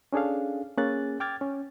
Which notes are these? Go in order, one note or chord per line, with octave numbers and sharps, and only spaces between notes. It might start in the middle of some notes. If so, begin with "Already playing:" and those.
C#4 D4 G#4 A4 F5
A#3 C#4 G#4 F#6 A6
G5 D6 F6 G#6 A6
C#4